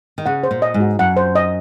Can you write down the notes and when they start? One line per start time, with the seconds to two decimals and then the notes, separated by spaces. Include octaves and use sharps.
0.18 D#3
0.26 C#3 F#5
0.44 C5
0.51 A#2
0.62 D#5
0.74 G#2
0.80 F#4
0.99 F#2 F#5
1.17 C5
1.35 D#5